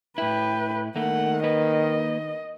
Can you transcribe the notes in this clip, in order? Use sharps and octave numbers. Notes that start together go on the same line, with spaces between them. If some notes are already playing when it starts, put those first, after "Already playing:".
A2 E4 B4 G5
D#3 A3 A#3 F#5
A#3 B4 D#5